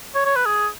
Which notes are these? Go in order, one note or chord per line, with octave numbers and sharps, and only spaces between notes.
C#5
C#5
B4
G#4